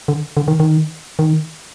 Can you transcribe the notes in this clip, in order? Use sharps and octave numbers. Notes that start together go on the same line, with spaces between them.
D3
D3
D#3
D#3
D#3